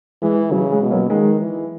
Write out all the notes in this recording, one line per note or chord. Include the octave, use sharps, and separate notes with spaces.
E3 G#3
C#3 F#3
G#3
B2
F#3 A#3
D#3 G#3
E3